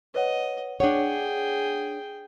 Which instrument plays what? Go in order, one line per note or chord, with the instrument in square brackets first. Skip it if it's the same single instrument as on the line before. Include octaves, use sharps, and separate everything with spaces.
[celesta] B4 C#5 F#5 [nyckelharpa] D#5
[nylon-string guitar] D4 C#5 [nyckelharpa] G#4 G5 [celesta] F#5